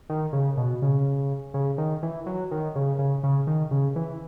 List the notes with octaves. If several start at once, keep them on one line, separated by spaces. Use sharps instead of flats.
D#3
C#3
B2
C#3
C#3
D#3
E3
F#3
D#3
C#3
C#3
C#3
D#3
C#3
E3